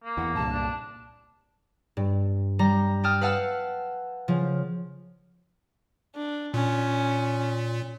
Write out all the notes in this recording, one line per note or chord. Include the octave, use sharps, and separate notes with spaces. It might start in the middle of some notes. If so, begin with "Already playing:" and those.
A#3
E2 E3 F#5
C2 G2 A#2 A5
D4
G2
G3 A#5
G5 A5 D#6 F6
B4 F5 F#5 A5 E6 F6
C#3 F3
D4
A#2 C#4